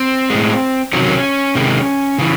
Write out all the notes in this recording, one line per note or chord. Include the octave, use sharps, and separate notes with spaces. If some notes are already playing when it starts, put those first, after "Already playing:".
Already playing: C4
A2 G#3
C3 D#3 F#3 C#4
C3 D#3 G#3
C#3 E3